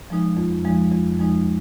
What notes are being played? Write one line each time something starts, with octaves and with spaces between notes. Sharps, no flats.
F3 G#3 D#4
F2
F3 G#3 D#4
F2
F3 G#3 D#4